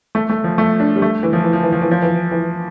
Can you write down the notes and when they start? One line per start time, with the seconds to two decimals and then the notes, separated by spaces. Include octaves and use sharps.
0.15 A3
0.29 A3
0.44 F3
0.58 A3
0.80 D4
0.96 G3
1.02 A3
1.23 E3
1.33 F3
1.44 E3
1.53 F3
1.63 E3
1.72 F3
1.82 E3
1.91 F3
2.02 E3
2.32 E3